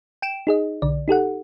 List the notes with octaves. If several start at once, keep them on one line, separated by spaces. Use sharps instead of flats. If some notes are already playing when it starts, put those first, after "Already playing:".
G5 D7 E7
D#4 G#4 D#5
B1 D3 D5
D#4 G4 A4 F#5